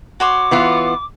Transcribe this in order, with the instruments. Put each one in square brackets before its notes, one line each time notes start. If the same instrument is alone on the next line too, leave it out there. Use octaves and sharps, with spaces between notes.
[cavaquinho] F#4 C#5 C6 [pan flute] D6
[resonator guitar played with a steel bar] E3 B3 F4